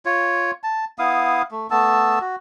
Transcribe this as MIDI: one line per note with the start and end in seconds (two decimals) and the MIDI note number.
0.05 0.51 65
0.05 0.51 73
0.64 0.85 81
0.99 1.42 59
0.99 1.42 64
0.99 1.42 77
0.99 1.42 87
1.51 1.67 57
1.70 2.19 57
1.70 2.19 59
1.70 2.19 81
1.70 2.19 88
2.21 2.36 66